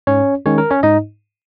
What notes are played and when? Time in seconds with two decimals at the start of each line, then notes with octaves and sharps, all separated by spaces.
0.07 G#2 C#4 C#5
0.46 D#3 G#3 C#4 C#5
0.58 A#4
0.71 C#4 C#5
0.83 G#2 D#4 D#5